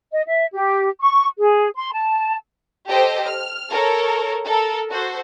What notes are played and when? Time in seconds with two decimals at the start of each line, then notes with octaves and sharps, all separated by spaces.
0.11 D#5
0.27 E5
0.53 G4
0.99 C#6
1.38 G#4
1.74 C6
1.94 A5
2.88 G4 A4 C5 D#5 G5
3.24 F6
3.72 A4 A#4 C#5
4.46 A4 A#4
4.90 F#4 A4 C5